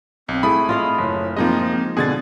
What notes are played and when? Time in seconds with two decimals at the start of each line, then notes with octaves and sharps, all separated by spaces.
0.29 B1 C4
0.43 A3 E4 G#4 B5 D#6
0.69 F4 D#5 F5
0.98 F#1 C#5
1.37 F3 G#3 A#3 C4 D#4 D#5
1.97 B2 D3 C4 G#4 G#6 A6